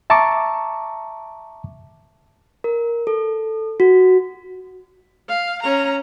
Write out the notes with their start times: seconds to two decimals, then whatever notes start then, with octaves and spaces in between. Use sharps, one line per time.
0.10 E5 A5 A#5 C#6 D6
2.64 A#4
3.07 A4
3.80 F#4
5.29 F5
5.63 C#4 A#5